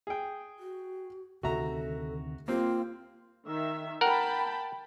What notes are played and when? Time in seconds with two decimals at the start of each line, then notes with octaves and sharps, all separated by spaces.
0.07 G#4 G5
0.59 F#4
1.43 D2 C3 D#3 F#4 A4 E5 A#5
2.48 A#3 C4 F4 G4
3.46 D#3 E5
4.01 A#4 F#5 G5 A5 B5